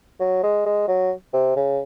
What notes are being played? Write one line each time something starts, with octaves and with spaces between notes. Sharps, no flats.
F#3
G#3
G#3
F#3
C3
C#3